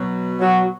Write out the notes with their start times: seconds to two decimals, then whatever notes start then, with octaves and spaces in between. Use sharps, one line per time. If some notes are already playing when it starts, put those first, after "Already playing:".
Already playing: B2 F#3
0.40 F#3 F#4